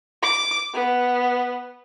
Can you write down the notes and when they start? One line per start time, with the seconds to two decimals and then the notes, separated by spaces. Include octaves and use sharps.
0.23 D6
0.74 B3